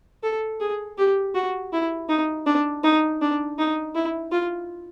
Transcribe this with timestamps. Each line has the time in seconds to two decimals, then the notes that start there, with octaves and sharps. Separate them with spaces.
0.23 A4
0.60 G#4
0.98 G4
1.34 F#4
1.73 E4
2.09 D#4
2.46 D4
2.83 D#4
3.21 D4
3.58 D#4
3.95 E4
4.32 F4